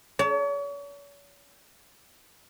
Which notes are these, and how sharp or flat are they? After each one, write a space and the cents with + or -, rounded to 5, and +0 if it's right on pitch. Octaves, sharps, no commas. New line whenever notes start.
C#5 +40 A5 +30